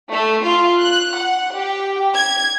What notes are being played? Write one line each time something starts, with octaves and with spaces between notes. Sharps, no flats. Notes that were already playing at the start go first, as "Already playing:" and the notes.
A3
F4
F#6
F#5
G4
G#6